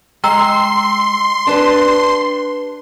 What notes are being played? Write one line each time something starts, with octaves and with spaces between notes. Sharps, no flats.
G#3 G5 A#5 C6 E6
D4 G4 B4 A5